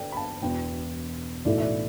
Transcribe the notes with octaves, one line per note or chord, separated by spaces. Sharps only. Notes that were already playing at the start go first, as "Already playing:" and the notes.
Already playing: D3 A4 B4 D5 G5
B5
A5
E1 E2 B2 G5
B1 A2 E3 A3 E4 D5
E5
D5